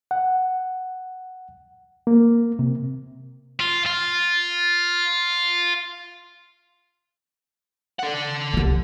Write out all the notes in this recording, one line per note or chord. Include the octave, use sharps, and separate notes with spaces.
F#5
A#3
C3
F4
F4
A4 F#5
C2 C3